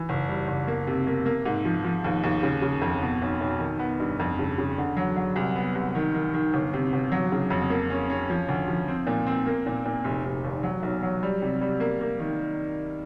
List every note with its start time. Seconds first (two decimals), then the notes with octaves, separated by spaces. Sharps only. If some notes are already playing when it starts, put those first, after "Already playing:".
Already playing: E3
0.09 F#1
0.28 G3
0.47 F#1
0.68 A#3
0.87 C3
1.07 A#3
1.26 A#3
1.46 G#2
1.65 F3
1.85 F3
2.04 D#2
2.24 D#2
2.43 C#3
2.62 C#3
2.82 F2
3.02 B2
3.22 B1
3.41 B1
3.60 D#3
3.79 B3
4.00 G2
4.20 F2
4.39 C#3
4.58 C#3
4.78 D3
4.97 F#3
5.17 F#3
5.36 C2
5.56 B3
5.75 C2
5.95 D#3
6.14 D#3
6.34 D#3
6.54 G1
6.73 C3
6.93 G1
7.12 F#3
7.32 C#3
7.50 F2
7.70 A#3
7.90 C#4
8.10 C#4
8.30 F3
8.49 D2
8.68 F3
8.88 C4
9.07 A#2
9.27 C4
9.46 A#3
9.66 A#2
9.85 A#2
10.04 F1
10.25 F1
10.44 D#2
10.63 F#3
10.83 B1
11.03 F#3
11.23 G3
11.42 C3
11.61 G3
11.80 A#3
12.01 A#3
12.19 D#3